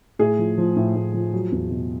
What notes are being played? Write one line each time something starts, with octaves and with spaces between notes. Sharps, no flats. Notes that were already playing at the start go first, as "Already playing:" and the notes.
A2 G#4
F3
F3
A2
A2
F3
F#3
E2
B2